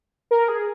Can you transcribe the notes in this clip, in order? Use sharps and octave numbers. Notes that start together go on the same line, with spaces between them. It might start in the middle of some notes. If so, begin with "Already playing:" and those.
A#4
G#4